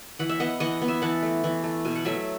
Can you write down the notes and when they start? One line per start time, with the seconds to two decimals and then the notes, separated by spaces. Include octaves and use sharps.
0.19 E3 F#5
0.29 E5
0.40 B3 D#5 F#5
0.60 E3 D#5 F#5
0.82 B3
0.88 E5 G#5
1.02 E3 F#5 A5
1.22 A3
1.44 E3
1.64 A3
1.85 B2 G#5
1.95 F#5
2.05 F#3 A3 E5 G#5